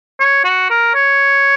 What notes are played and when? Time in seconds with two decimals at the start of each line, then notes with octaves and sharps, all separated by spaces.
0.20 C#5
0.44 F#4
0.70 A#4
0.95 C#5